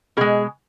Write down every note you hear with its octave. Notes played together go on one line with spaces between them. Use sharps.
B2 G#3 G#4